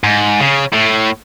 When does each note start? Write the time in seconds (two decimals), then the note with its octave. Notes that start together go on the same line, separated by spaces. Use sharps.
0.04 G#2
0.40 C#3
0.73 A2